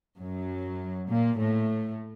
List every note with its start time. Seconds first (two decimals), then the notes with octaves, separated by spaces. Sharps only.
0.19 F#2 F#3
1.09 A#2 A#3
1.39 A2 A3